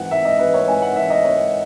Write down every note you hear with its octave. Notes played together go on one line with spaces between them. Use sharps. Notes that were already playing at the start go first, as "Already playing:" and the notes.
Already playing: G#2 E3 F#5
G#2 E5
D#5
E3 B4
C#5
G#2 G#5
F#5
E3 E5
D#5
G#2 C#5